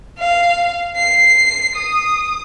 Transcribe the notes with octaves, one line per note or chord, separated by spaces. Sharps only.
F5
C7
D#6